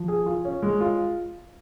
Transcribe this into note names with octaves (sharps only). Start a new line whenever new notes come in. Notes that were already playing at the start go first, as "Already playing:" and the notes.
Already playing: F3
G#4
F4
C#4
G#3
F4